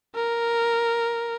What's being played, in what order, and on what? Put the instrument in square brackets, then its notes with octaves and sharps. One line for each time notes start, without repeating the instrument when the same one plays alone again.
[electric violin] A#4